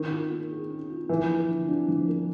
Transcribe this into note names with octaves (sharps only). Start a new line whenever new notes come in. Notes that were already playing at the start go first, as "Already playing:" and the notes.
Already playing: D#3 C#4
F4
A#3
G#4
C#4
F4
E3 F3
A#3
D3
D4
F3
A#3